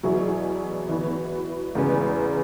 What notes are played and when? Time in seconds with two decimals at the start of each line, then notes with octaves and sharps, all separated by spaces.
0.03 E2 B2 F#3 E4 G#4
0.89 E3 B3 F#4
1.75 E2 C#3 G#3 B3 G#4